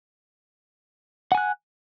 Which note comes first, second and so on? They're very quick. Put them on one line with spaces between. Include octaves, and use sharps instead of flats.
F#5 G#5 F#6